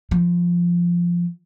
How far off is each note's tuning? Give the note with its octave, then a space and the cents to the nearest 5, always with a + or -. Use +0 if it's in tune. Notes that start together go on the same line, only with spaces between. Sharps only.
F3 -5